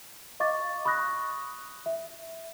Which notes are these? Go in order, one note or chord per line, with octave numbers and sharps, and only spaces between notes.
D#5 F5 C#6 D6 A6
B5 C#6 D#6 F#6 A#6
E5